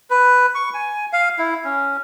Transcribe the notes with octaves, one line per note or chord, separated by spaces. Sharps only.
B4
C#6
G#5
F5
E4
C#4